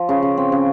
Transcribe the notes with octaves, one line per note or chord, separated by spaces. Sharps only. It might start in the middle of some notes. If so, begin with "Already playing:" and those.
Already playing: F3
C#3
C#3
C4
C#3